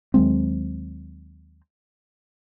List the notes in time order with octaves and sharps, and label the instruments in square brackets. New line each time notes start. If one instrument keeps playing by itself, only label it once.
[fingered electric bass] D#2 F#3 G#3 C4